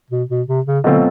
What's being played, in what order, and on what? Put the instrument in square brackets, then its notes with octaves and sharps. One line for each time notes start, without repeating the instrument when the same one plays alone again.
[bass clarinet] B2
B2
C3
C#3
[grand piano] B2 F#3 A3 C4 F4 [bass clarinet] D3